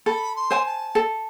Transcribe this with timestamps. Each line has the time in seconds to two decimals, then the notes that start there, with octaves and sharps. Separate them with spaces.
0.06 A4 B5
0.36 C6
0.51 C5 G#5
0.66 A5
0.95 A4